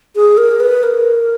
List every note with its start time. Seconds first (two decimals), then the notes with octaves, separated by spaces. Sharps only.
0.16 G#4
0.37 A#4
0.60 B4
0.83 A#4